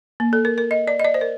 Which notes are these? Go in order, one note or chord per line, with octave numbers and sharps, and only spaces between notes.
A#3
A4
A#4
A#4
D#5
D5
D#5
D5
C5
A#4